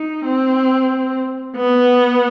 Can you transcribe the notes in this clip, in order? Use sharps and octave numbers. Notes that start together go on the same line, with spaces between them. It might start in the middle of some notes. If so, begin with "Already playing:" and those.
Already playing: D#4
C4
B3